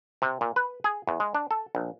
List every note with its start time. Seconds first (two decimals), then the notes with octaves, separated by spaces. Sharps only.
0.22 C3
0.41 A#2
0.56 B4
0.84 G#4
1.07 E2
1.20 G#3
1.35 D4
1.51 A4
1.75 A#1